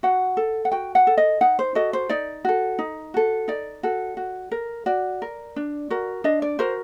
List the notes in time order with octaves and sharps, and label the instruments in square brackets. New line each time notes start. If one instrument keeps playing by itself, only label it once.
[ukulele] F#4 F#5
A4
F#5
F#4 G5
F#5
A4
D#5
D#4 F#5
C5
F#4 A4 D#5
C5
D#4 D5
F#4 A4
D#4
F#4 A4
D#4 D5
F#4 A4
F#4
A#4
F#4 D5
A#4
D4
F#4 A#4
D4 D#5
D5
F#4 A#4 C5